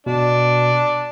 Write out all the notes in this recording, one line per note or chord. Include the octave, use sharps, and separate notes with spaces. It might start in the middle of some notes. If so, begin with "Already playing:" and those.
B2 D4